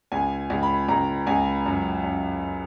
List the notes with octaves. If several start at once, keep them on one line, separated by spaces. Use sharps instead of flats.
C#2 G#5
C#2
B5
C#2 A#5
C#2 G#5
F#2
F#2